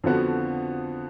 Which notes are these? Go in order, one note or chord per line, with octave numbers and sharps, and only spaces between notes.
F2 D3 F3 B3 F#4